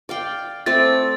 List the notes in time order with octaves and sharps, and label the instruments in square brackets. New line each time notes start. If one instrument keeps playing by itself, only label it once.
[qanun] D5 F5 G5
[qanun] A3 C4 D5 [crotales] A6